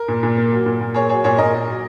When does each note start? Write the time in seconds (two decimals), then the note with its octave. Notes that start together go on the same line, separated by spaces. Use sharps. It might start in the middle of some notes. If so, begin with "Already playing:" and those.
Already playing: A#4
0.08 A#2
0.23 A#2
0.37 A#3
0.52 F#3
0.66 A#2
0.81 A#2
0.94 A#3 G#4 C#5
1.09 F#3 G#4 C#5
1.24 A#2 G#4 C#5
1.38 A#2 A#4 D#5
1.53 A#3
1.68 F#3